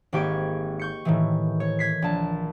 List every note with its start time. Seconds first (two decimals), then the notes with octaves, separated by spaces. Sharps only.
0.13 G#1 A#3 G4 C#6 G#6 D7
0.79 C#6 G6 C#7
1.05 A2 D#3 E3
1.60 C#5
1.79 G#6 B6 C7
2.02 A#1 A5